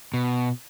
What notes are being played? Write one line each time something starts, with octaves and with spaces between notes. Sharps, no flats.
B2